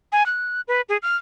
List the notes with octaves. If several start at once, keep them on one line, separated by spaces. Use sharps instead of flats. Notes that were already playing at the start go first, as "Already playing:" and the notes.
G#5
F#6
B4
G#4
F6